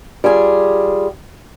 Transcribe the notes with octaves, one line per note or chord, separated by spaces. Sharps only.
G3 F4 G#4